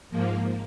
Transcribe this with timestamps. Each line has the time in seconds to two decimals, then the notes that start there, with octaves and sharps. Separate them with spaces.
0.10 G#2 F3 A#3